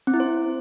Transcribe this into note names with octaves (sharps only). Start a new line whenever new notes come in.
C4
E4
C5